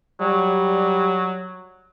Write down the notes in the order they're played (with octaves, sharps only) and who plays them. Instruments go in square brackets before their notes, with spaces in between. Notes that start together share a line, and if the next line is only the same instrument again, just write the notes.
[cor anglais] F#3 [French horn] G3